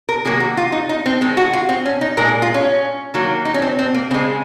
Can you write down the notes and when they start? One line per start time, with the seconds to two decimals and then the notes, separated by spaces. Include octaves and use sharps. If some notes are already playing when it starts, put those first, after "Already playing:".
0.09 A#4
0.25 C3 D#3 F#3 A#3 G#4
0.40 F#4
0.57 F4
0.72 D#4
0.89 D#4
1.06 C4
1.21 D#3 G#3 C4
1.37 F#4
1.53 F4
1.69 C4
1.86 C#4
2.01 D#4
2.17 A#2 G#3 A#4
2.42 F4
2.54 C#4
3.14 D#3 F#3 A#3
3.45 D#4
3.54 C#4
3.62 C4
3.79 C4
3.94 A#3
4.11 C#3 C4
4.14 G#3